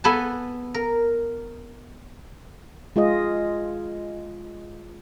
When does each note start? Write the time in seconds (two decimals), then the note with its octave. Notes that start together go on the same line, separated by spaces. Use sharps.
0.04 B3 A4 B4 G#5 A5
0.74 A#4
2.96 G#3 F4 G#4 D#5